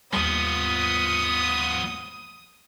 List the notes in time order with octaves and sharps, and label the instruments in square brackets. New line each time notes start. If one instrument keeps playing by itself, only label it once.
[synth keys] D#2 G3 [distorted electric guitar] F3 B3 [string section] D#6